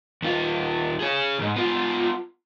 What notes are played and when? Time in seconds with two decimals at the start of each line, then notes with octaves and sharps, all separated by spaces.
0.22 D#2 F4
1.00 G#4 C#5
1.38 C#2 G#2
1.56 B3 F4